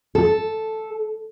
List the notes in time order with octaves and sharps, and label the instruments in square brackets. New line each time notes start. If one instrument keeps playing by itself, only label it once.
[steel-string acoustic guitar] A4